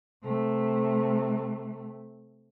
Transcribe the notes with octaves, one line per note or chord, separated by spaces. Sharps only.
C3 A3